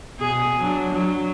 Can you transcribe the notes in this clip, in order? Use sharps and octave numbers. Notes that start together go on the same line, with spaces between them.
B2 G#4
F#3 D4
F#3